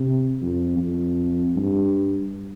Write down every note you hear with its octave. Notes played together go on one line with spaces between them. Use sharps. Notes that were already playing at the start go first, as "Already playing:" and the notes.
Already playing: C3
F2
F2
G2